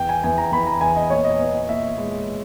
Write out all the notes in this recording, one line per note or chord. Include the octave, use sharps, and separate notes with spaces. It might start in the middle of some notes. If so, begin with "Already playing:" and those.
Already playing: E2 G5
G#5
E2 G#5
A#5
E2 B5
A#5
E2 G#5
D#5
A#2 C#5
D#5
B3
D#5
A#2 E5
G#3